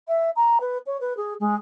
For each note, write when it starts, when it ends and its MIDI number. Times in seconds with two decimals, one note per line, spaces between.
0.08 0.30 76
0.36 0.58 82
0.60 0.78 71
0.86 0.99 73
1.00 1.16 71
1.17 1.34 68
1.40 1.55 56